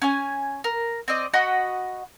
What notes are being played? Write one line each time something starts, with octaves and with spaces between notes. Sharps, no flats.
C#4 G#5
A#4
C4 D5 D#5
F#4 D#5 F#5 B5